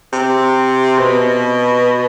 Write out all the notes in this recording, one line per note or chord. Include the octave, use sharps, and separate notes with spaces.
C3
B2